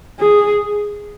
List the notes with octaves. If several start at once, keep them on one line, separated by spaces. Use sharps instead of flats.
G#4